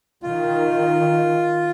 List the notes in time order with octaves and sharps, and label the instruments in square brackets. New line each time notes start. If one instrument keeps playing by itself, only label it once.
[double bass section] D#3 [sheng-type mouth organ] F4